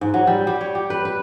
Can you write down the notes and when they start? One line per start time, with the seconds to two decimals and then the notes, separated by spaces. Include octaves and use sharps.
0.01 G#2
0.14 F#3
0.27 G3
0.47 G3
0.61 C#5
0.75 G4
0.90 B4
1.05 B4